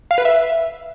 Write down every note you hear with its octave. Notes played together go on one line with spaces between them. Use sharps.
F5
B4
E5